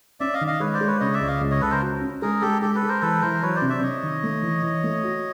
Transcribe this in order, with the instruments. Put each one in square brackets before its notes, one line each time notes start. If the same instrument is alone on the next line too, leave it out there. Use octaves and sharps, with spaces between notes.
[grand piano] C#4 [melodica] D5 E5
[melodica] D#5 F5
[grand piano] D#3
[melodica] D#5 F5
[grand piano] G#3 [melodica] B4 C#5
[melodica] C5 D5
[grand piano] G#3
[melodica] B4 C#5
[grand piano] C#3 [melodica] C#5 D#5
[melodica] D5 E5
[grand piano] C#2
[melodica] D#5 F5
[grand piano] C#2
[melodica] C#5 D#5
[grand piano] C#2 [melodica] A4 B4
[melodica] A#4 C5
[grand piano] F#4
C#4
[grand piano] G#3 [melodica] G#4 A#4
[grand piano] G#3 [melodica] G4 A4
[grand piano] G#3 [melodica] G4 A4
[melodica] A4 B4
[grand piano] G#3
[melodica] A#4 C5
[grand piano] E3 [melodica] A4 B4
[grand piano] E3 [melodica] A#4 C5
[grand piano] F#3 [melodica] B4 C#5
[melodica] C5 D5
[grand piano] C3
[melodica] D5 E5
[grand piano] C3 [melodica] C#5 D#5
[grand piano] D#3
A3
E3
E3
A3
F#4